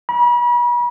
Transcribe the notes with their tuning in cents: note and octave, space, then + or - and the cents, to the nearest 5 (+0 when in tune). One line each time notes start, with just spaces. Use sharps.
B5 -40